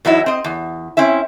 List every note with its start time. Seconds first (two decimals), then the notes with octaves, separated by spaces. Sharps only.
0.05 E2 F#3 D#4 E4
0.26 C4 D#5
0.44 E2
0.97 C4 C#4 E4 E5